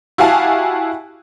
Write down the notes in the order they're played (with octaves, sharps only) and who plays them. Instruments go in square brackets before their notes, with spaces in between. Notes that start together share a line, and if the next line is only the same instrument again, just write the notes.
[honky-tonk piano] E4 F#4 G4 F5 G#5 A5